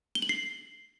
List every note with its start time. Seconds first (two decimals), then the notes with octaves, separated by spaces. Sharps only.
0.15 G7
0.22 F#7
0.29 C7